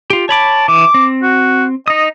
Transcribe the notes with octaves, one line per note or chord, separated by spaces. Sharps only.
F4 G4
C#5 A5 B5 D6
E3 D6
C4
F#4
D#4 D#5 D#6